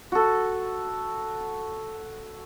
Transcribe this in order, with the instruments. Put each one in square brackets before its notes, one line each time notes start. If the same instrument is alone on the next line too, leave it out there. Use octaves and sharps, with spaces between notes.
[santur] F#4 A4